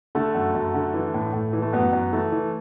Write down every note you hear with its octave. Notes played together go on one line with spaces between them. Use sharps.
D3 A3
F#2
F#2
D3
E3
A2
A2
E3
A3
F#2 B3
F#2
E3 A3
E3